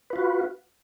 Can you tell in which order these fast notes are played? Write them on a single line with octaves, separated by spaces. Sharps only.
B4 F4 F#4